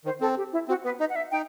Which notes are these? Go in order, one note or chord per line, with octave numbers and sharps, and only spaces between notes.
D#3 C5
C4 A4
G4
E4
C4 F#4
B3 B4
D#4 D#5
F#5
E5
D#4 G5